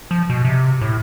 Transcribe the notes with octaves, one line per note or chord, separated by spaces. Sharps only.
F3
B2
C3
A2